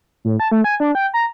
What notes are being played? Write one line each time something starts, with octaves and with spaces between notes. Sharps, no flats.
A2
A5
A3
G#5
D4
G5
A#5